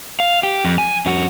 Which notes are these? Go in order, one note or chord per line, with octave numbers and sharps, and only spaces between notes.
F5
G4
F2
G#5
F2 F#4